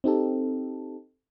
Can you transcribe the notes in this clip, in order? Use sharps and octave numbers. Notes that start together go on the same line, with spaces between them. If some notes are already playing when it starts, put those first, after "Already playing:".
C4 D#4 G4 A4